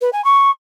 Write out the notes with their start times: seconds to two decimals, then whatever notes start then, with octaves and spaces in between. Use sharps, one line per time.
0.01 B4
0.12 G#5
0.24 C#6